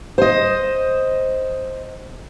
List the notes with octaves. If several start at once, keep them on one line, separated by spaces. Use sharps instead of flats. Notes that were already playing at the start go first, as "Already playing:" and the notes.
C5 D#5